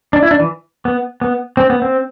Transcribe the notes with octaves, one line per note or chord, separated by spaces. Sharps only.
D4
E4
D4
E3
B3
B3
C4
B3
C4